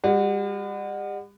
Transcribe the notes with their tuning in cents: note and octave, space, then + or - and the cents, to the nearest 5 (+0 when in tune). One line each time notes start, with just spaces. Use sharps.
G3 +40 F#4 +0